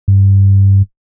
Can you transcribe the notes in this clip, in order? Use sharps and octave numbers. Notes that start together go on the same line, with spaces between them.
G2